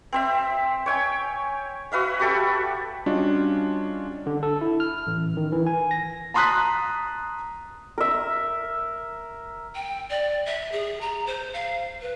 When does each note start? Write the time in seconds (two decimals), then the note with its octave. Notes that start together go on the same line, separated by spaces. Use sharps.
0.12 C4 C5 E5
0.86 C#5 G5 G#5
1.92 F#4 B4 E5 F5
2.19 F#4 G4 A4 E5
3.06 G3 C#4 D4 F4 F#4 D#5
4.26 D3
4.43 A4
4.61 E4
4.80 F6
5.07 A1
5.37 D#3
5.52 E3
5.67 G#5
5.91 A#6
6.34 A5 A#5 C6 D#6 F#6 B6
7.98 A#4 E5
9.75 G5
10.10 D5
10.45 E5
10.72 G#4
11.01 A#5
11.26 C5
11.53 F5
12.01 B4